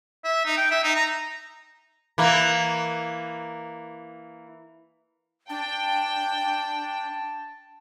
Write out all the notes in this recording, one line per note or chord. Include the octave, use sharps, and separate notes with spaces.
E5
D#4
G5
E5
D#4
A#5
E3 A#3
D4 G5 A5